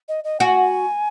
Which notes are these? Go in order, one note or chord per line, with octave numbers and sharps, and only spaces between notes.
D#5
D#5
F#4 G#5